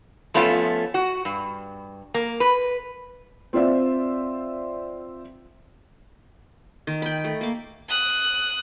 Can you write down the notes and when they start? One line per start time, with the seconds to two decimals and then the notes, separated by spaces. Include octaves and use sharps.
0.34 F3 A3 B3 C#4 F4 E5
0.94 F#4
1.25 G2
2.14 A#3
2.40 B4
3.53 C4 F4 C5 D5 E5
6.87 D#3
7.02 G5 B5
7.24 A3
7.41 A#3 D6
7.89 D#6 F#6